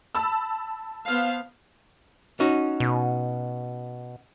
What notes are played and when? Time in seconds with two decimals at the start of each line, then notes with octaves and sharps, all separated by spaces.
0.15 A5 B5 E6
1.06 B3 C5 F5
2.40 C#4 D#4 F#4
2.80 B2